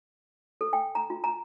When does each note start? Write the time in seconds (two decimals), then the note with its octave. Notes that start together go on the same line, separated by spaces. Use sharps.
0.61 A4
0.73 G5
0.95 A#5
1.10 F4
1.24 A#5